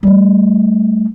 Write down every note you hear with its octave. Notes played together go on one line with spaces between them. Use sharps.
G3 A3